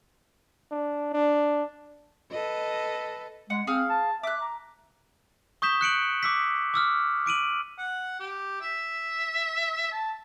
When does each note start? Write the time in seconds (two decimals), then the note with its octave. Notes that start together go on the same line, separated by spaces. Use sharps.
0.71 D4
1.13 D4
2.31 A4 B4 D#5
3.50 G#3 F#5
3.67 C4 G#4 F5 F6
3.90 A5
4.23 E5 D6 F#6
4.41 A#5
5.62 C#6 D#6 G6 B6 E7 G7
5.81 F#6 C#7 D7 F#7
6.23 D6 E6 B6
6.74 D6 E6 F6
7.26 D6 D7 D#7 F#7
7.78 F#5
8.20 G4
8.61 E5
9.92 A5